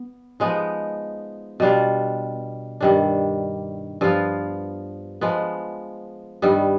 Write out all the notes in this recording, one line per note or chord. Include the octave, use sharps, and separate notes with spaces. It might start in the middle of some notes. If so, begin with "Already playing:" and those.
Already playing: B3
F3 G#3 B3 D#4
B2 G3 D4 F4
G2 D#3 G3 D4
G2 F3 B3 F4
F3 G#3 B3
G2 D#3 G3 B3